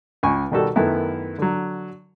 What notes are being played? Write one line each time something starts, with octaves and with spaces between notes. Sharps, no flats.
C#2 G#5 C#6
B2 D#3 G3 F#4 A4
F#2 D#3 A3 B3 E4
D3 F#3